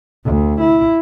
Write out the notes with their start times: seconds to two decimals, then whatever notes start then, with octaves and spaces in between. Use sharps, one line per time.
0.25 D2
0.61 E4